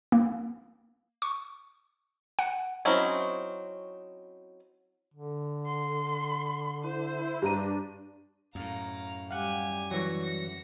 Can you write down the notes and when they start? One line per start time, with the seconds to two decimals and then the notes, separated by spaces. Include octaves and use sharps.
0.12 A#3
1.22 C#6
2.39 F#5
2.85 F#3 C4 C#4 D#4 E4
5.14 D3
5.66 C6
6.84 E4 C5
7.42 G2 D4 A#5 D#7
8.55 F#2 A2 F5 A#5
9.31 G3 G4 F5 F#5 G#5
9.91 E3 F#3 C#6 A#6
10.23 A#6 C#7